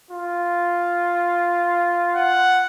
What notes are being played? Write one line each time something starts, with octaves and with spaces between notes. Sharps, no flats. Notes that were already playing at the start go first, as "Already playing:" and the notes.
F4
F#5